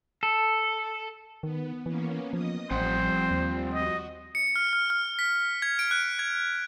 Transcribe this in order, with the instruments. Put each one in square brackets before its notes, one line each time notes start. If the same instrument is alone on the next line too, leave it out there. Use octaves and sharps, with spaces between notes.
[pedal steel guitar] A4
[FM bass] D#3 [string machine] B3
[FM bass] E3 [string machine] A#3 B3 C#4
[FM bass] F3 [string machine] D#5 D#6
[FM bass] A1 [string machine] F3 G3 [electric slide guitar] C4 F#5 [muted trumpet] C5
[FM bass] D#2
[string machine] F#4 [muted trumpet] D#5
[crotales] C#7
F6
F6
F6
B6
G#6
D7
F#6
G#6